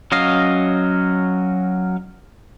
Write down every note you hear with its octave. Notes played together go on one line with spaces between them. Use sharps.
F#3 C#4 D#5 F5